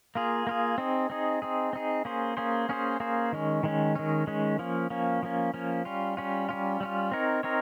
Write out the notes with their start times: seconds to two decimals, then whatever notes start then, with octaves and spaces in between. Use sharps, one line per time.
0.15 A#3 F4 G#4
0.47 A#3 F4 G#4
0.78 C4 D#4 G#4
1.10 C4 D#4 G#4
1.42 C4 D#4 G#4
1.73 C4 D#4 G#4
2.05 A#3 C#4 G#4 C5
2.37 A#3 C#4 G#4 C5
2.69 A#3 C#4 G#4 C5
3.00 A#3 C#4 G#4 C5
3.32 D#3 G#3 C#4
3.63 D#3 G#3 C#4
3.95 D#3 G#3 C#4
4.27 D#3 G#3 C#4
4.59 F3 A#3 C#4
4.90 F3 A#3 C#4
5.23 F3 A#3 C#4
5.54 F3 A#3 C#4
5.85 G3 C#4 F4
6.17 G3 C#4 F4
6.49 G3 C#4 F4
6.80 G3 C#4 F4
7.11 C4 D#4 A#4 C#5
7.43 C4 D#4 A#4 C#5